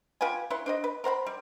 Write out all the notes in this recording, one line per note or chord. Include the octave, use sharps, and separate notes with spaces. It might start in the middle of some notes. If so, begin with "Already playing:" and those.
F4 G4 B4 G#5
E4 B4 C#5 C6
D4 C5 D#5
B4
A#4 C5 F#5 B5
G3